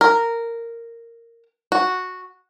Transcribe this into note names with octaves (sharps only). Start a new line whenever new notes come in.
A#4
F#4